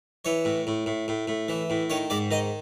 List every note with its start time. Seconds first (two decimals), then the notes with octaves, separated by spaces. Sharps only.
0.25 E3 C#5
0.45 A2
0.67 A2
0.86 A2
1.08 A2
1.28 A2
1.49 E3
1.70 A2
1.90 D#3 C#5
2.10 G#2 D5
2.31 D#3 D#5